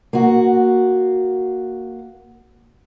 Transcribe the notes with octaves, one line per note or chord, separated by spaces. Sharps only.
A#3 F#4